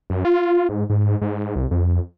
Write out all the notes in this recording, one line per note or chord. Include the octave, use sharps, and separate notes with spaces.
F#2
F4
G#2
G#2
G#2
C2
F2